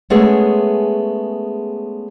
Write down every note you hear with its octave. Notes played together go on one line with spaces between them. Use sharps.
G#3 A3 B3 C#4 G#4